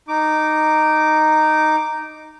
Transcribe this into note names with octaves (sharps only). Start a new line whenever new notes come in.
D#4 D6